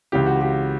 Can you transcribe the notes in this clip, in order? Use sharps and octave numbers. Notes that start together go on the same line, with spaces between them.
C#2 C#3 E3 G4
F#4
G4